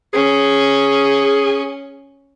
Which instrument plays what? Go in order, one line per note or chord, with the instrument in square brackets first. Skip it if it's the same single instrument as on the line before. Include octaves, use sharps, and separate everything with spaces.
[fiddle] C#4 [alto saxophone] G#4